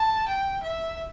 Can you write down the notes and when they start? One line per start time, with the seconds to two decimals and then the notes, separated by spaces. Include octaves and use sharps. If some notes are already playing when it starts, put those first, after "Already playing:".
Already playing: A5
0.28 G5
0.63 E5